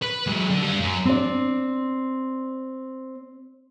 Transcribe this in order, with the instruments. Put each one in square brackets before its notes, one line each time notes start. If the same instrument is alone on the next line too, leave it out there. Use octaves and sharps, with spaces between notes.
[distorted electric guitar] B4
F#3 G#3
D3
G3 F5
F#2
[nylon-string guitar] C4 D4 D5